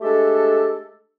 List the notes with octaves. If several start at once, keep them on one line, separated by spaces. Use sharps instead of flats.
G#3 A3 D4 G4 A4